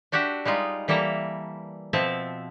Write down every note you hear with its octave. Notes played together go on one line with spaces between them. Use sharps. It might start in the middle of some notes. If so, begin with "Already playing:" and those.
D4 F#4 G4 E5 F#5
G3 G#3 D#4 F4
E3 G3 A#3 A4 E5 A#5
B2 F3 C4 E5 A5